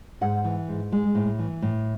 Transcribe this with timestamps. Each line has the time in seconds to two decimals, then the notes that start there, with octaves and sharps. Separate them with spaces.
0.21 G#2 F#5
0.45 E3
0.68 G#2
0.92 G#3
1.15 A2
1.39 E3
1.62 A2